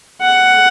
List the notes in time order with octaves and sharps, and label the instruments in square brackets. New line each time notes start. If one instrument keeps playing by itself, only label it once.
[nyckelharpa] F#5